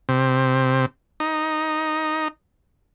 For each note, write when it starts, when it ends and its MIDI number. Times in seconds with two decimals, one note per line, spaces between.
0.09 0.86 48
1.20 2.28 63